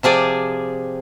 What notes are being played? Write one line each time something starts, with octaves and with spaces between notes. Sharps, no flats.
C3 F3 G#4 D5